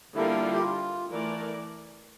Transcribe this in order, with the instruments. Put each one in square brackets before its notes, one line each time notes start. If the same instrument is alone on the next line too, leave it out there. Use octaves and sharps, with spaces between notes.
[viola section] D3 G3 A#3 F4 A#4 [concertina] E4
[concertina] G4
F4
[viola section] E3 A3 E4 A#4 D5